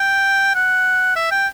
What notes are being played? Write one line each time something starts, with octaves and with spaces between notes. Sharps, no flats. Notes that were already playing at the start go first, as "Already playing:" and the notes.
Already playing: G5
F#5
E5
G5